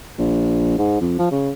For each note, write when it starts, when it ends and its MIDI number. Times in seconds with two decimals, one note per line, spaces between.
0.18 0.78 34
0.78 0.98 44
1.01 1.17 41
1.19 1.27 53
1.31 1.51 49